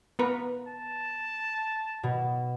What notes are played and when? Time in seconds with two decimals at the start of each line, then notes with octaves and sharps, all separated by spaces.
0.19 B3 A#4 B4
0.68 A5
2.03 B2